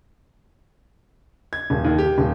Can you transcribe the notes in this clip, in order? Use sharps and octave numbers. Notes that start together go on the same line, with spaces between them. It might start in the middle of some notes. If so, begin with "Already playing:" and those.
G#6
D#1
D#2
G4
D#1